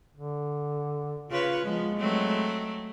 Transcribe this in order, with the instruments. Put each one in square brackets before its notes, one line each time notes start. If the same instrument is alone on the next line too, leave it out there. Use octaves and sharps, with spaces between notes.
[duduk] D3
[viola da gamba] C#3 B4 C#5 [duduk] F4
[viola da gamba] F3 B3 [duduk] G#3
[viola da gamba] F#3 A3 C4